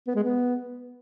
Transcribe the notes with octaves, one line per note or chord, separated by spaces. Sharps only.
B3
G#3
B3